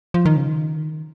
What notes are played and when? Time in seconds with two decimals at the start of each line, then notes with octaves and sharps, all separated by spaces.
0.14 F3
0.25 D#3
0.36 C#3
0.48 D#3